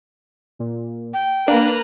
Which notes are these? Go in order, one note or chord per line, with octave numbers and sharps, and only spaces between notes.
A#2
G5
A#3 D4 B4 F5 A#5